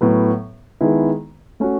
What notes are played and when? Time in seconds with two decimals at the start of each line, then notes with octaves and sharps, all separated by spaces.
0.01 A2 F#3 B3
0.81 D#3 G#3 B3 E4
1.60 A3 C#4 F#4